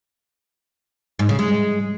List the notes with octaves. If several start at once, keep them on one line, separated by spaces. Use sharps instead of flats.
G#2
C#3
G#3